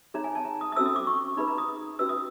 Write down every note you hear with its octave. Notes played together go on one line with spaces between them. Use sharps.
D#4 G#4 C#5 A#5
G#5
A5
A#5
D#6
D#6
C#4 F#4 A4 C5 E6
D#6
D6
C#6
D#4 G#4 B4 B5
A#5
D#6
C#4 F#4 B4 E6
D#6